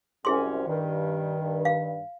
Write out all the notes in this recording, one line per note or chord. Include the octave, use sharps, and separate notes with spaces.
C2 F#2 C#4 E4 G#4 C6
G2 D#3
F5